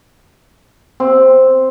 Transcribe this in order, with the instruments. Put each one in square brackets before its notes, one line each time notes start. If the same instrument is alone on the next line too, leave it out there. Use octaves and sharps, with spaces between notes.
[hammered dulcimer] C4